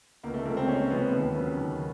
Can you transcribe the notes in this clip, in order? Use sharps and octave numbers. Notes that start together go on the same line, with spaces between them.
C#2 A#3
A3
C3 F3 G#3 A#3
C4
C#2 C#4
C3 F3 G#3 B3
D#2
C#3 F#3
D#2